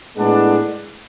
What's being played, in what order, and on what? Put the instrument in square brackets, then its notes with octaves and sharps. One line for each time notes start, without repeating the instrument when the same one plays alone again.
[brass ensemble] A2 G#3 B3 D4